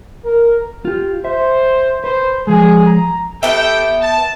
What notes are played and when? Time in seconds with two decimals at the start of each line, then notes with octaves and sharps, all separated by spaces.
0.24 A#4
0.85 F4 G4
1.24 C5 E5
2.04 B4 C5
2.47 F3 G#3 G#4
2.85 A#5
3.43 B3 G4 A4 E5 G5
4.01 A5